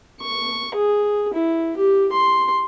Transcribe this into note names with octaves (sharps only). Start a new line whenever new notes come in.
C#6
G#4
E4
G4
C6